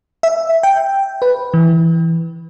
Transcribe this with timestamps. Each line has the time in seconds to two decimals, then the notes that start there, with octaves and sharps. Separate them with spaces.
0.23 E5
0.63 G5
1.22 B4
1.54 E3